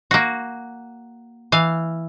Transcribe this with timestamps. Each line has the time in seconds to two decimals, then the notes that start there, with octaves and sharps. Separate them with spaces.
0.11 A#3 F#4
1.52 E3 F5